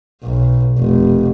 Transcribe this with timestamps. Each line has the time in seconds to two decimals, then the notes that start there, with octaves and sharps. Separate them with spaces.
0.23 B1
0.78 F1